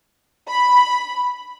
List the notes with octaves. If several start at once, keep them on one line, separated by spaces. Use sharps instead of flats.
B5